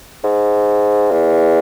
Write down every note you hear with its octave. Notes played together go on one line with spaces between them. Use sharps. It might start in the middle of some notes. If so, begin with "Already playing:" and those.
G#2
E2